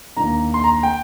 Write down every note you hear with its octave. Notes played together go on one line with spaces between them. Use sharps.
D#2 D#3 A#3 D4 A#5
C6
A#5
G5